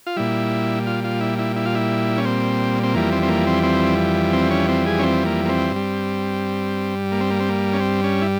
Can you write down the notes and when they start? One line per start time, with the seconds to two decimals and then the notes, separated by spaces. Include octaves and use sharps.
0.06 F4
0.17 A#2 G3 E4
0.87 F4
1.04 F4
1.21 E4
1.39 E4
1.56 E4
1.66 F4
1.75 E4
2.18 C#4
2.25 C4
2.83 C4
2.94 F2 E3 G3 A#3
3.12 C4
3.23 C4
3.29 A#3
3.47 C4
3.63 C4
4.33 C4
4.51 C#4
4.69 C4
4.86 G#4
4.99 C#4
5.03 C4
5.26 A#3
5.45 A#3
5.49 C4
5.72 G2 G3
7.12 A#3
7.20 C4
7.30 A#3
7.40 C4
7.49 A#3
7.73 C#4
7.80 C4
8.04 C#4
8.21 E4